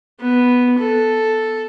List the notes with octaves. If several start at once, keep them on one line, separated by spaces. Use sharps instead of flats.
B3
A4